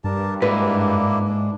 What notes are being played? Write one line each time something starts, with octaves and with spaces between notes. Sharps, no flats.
G2 D4 A#4 A5
G#2 A#3 D4 E4 B4
D4